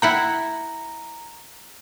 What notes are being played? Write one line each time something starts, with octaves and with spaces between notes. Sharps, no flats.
E4 F#5 G5 A#5